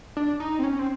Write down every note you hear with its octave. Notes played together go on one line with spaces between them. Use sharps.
D4
D#4
C4
C#4
C4